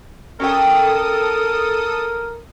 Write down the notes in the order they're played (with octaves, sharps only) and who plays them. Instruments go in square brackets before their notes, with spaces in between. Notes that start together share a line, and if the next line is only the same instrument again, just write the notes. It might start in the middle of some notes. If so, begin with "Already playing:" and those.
[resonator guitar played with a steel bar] C#4 G4 G5 [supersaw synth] A4 D#6 [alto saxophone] A#4